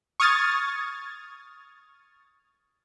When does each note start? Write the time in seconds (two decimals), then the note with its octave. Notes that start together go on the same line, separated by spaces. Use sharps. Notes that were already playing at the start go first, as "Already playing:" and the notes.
0.20 C#6 D#6 F6 G#6 A6